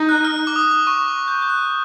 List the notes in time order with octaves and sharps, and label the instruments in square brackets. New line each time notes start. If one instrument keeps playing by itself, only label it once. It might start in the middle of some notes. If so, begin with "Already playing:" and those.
Already playing: [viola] D#4
[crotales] F#6
F6
D6
D#6
D6
C#6
D6
G6
G6
F#6